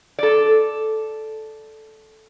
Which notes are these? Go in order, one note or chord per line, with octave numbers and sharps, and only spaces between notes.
A4 D5